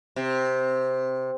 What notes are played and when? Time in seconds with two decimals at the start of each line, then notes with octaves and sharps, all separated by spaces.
0.16 C3